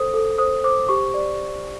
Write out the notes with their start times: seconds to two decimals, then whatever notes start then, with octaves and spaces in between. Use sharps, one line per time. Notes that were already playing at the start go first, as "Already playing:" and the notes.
Already playing: A4 C5 D#6
0.14 A4
0.38 C5 D#6
0.64 C5 D6
0.89 G4 C#6
1.14 D5